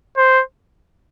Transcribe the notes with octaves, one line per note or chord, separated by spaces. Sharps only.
C5